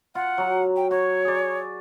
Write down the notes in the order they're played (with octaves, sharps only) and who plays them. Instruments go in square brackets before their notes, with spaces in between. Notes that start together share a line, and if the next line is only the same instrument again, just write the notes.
[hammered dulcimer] F4 [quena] F#5
[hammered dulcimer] F#3 A#5
[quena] G5
[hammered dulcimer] F#4 [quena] C#5
[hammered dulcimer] G#4 D5